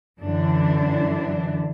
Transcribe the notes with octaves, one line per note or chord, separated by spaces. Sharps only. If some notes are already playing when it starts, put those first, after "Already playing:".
F#2 D3 E3 D4